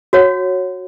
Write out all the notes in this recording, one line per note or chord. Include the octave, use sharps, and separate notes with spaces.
F#4 C#5 F#5